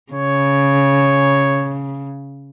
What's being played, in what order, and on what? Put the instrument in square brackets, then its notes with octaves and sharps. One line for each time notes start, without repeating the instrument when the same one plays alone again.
[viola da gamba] C#3 [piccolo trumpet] C#5